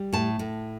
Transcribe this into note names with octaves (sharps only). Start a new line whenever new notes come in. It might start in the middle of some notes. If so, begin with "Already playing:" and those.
Already playing: G3
A2 A5
A2